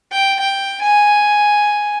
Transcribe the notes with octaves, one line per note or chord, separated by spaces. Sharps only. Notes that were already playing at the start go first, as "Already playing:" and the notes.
G5
G5
G#5